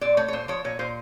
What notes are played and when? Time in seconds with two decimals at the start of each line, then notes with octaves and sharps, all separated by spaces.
0.01 A#2 D5
0.17 A3 C#5
0.28 C#5
0.33 A#2 C5
0.48 F3 C#5
0.64 A#2 C#5
0.79 A#2 C5